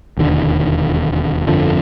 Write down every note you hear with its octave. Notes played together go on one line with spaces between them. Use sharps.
E1 D#2 D3
G1 F2 D3 F3